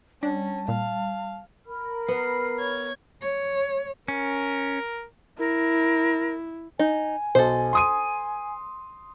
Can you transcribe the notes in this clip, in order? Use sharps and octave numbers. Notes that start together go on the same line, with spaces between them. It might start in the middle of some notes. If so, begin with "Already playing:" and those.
G3 C#4 D4 A5
A#2 F5
A#4 B5 F6
B3 C7
C#5 G#6
C#5
C#4 A#4
E4 A#4
D#4 G#5
B1 A4 C5
C6 D#6 D#7